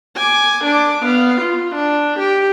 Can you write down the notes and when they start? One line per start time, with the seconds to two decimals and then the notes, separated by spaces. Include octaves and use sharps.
0.16 G#5 D6
0.64 D4 D6
1.05 B3 F5
1.41 F4
1.75 D4
2.19 G4